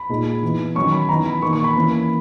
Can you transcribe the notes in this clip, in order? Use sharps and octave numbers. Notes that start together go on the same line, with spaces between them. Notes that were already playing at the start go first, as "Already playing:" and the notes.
Already playing: B5
A#2 G#3 D#4
E3 B3 D#4
D#3 F#3 C#4 C#6
B5
E3 B3 D#4 A#5
B5
D#3 A#3 D#4 C#6
C#6
B5
E3 A#3 C#4